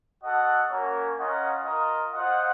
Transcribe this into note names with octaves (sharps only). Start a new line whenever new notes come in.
F#4 A4 D#5 F#5
A#3 C#4 F#4 A#4 C#5
C#4 F4 A#4 D#5 F#5
F4 A#4 D#5
F4 C5 D#5 F#5